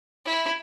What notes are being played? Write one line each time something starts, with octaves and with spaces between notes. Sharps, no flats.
E4